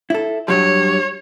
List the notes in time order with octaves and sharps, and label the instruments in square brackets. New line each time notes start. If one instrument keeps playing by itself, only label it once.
[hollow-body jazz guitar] E4 A4
[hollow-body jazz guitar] G2 F#3 G3 [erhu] C#5